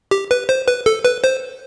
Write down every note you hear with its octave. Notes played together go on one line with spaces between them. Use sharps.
G4
B4
C5
B4
A4
B4
C5